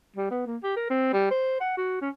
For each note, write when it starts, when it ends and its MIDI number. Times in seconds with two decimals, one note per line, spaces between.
0.16 0.30 55
0.31 0.43 59
0.46 0.57 58
0.63 0.74 67
0.77 0.89 70
0.90 1.13 60
1.13 1.29 55
1.31 1.61 72
1.61 1.77 78
1.77 1.97 66
2.01 2.09 61